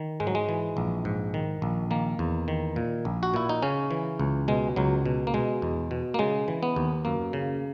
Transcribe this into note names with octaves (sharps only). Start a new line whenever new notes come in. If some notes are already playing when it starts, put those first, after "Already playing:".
Already playing: D#3
G#2 G#3
F#3
G#3
E3
A#1
G#2
D#3
A#1
D#3 A#3
E2
D#3
A#2
A#1
F#4
A#2 E4
D#4
C#3 C#4
E3
C#2
B2 G#3
C#2 F#3
B2
A#3
B2 G#3
E2
B2
A#3
C#3 G#3
E3
B3
D#2
F#2 A#3
C#3